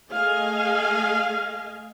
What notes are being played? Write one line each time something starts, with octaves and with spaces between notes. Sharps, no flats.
A3 G#4 D#5 F5 G#5